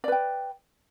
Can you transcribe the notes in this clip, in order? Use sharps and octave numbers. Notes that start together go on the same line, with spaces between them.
B4 D5 G5